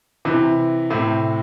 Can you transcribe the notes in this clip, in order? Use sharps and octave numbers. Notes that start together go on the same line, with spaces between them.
C3 E3
A2 C3